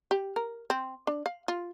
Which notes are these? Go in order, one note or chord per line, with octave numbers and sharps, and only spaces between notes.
G4
A#4
C4
D4
F5
F4